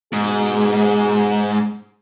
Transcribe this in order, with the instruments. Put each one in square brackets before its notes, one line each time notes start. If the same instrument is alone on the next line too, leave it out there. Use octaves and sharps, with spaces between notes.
[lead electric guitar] G#2 [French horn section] B2 G#4